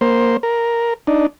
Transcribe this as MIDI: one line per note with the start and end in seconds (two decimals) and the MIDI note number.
0.01 0.37 58
0.01 0.37 72
0.43 0.94 70
1.07 1.27 62
1.07 1.27 63